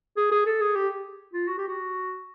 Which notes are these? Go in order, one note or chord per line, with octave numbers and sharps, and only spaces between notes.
G#4
G#4
A4
G#4
G4
F4
F#4
G4
F#4